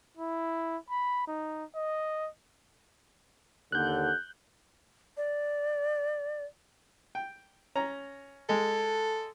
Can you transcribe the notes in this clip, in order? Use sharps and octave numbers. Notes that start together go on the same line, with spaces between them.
E4
B5
D#4
D#5
D#2 D3 F#6 G6
D5
G5
C#4 A#5
G#3 A4